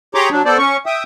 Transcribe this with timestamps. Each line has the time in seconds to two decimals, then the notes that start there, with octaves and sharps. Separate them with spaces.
0.15 G4 G#4 C#5 A#5 C6 D6
0.31 F#3 D4
0.45 B3 A4 C5 D5
0.58 C#4 C#6
0.86 E5 G5 D#6